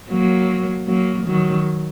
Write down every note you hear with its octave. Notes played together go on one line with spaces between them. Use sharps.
F#3 A#3
F#3 A#3
D#3 F#3